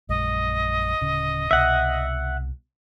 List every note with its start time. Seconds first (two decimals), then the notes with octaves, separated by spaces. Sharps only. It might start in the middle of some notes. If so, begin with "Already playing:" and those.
0.09 A#1 F#2 G#3 D#5
1.01 D1 C#3
1.51 C2 B2 E5 F#5